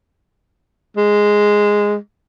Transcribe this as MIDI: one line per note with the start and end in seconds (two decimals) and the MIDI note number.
0.97 1.96 56